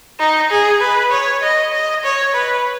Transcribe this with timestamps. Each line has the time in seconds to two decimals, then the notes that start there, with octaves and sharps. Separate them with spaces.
0.19 D#4
0.51 G#4
0.81 B4
1.11 C#5
1.42 D#5
1.73 D#5
2.04 C#5
2.34 B4